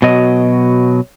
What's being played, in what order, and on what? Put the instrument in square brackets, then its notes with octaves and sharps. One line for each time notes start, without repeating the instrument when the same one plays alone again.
[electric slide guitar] B2 F#3 D#5